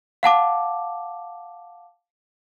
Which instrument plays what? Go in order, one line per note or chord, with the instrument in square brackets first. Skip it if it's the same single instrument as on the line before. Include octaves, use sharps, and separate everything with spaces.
[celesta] F5 F#5 A5 D6